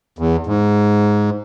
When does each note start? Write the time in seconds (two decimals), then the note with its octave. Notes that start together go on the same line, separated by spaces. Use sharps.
0.19 E2
0.47 G#2